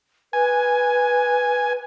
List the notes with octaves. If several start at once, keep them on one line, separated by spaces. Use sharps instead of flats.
B4 G#5